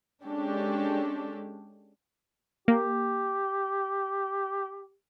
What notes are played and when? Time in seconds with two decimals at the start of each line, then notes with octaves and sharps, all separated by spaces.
0.24 G#3 C#4 D4 G4 A4
2.68 A#3 G4